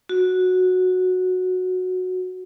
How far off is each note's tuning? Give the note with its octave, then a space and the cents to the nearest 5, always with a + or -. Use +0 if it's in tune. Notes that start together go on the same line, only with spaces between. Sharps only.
F#4 -10